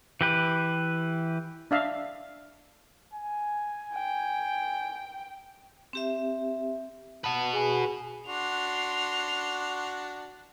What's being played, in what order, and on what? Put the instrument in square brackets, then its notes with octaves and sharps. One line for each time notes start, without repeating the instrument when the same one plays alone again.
[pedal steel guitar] E3 G4 B4
[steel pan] D4 E5 F5
[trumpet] G#5
[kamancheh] G5
[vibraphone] C4 G4 E5
[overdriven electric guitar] F#4 B4 [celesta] A5
[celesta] G#4 G#5
[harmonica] D4 F#4 [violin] C6 F7